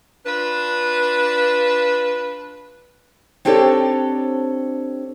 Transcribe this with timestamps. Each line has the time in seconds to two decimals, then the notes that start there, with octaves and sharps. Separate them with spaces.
0.26 D4 F4 B4
3.45 C4 D4 G4 A4 C#5